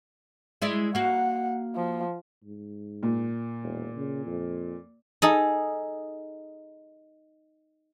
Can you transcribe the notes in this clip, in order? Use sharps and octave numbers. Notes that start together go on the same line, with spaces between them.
G#3 E4 D5
A#3 F#4 F#5
F3
G#2
A#2
E1
C#3
F2
D#4 G#4 A4